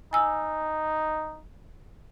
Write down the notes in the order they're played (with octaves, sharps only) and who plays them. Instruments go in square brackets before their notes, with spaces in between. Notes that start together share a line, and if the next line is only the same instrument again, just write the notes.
[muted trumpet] D#4 [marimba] G#5 E6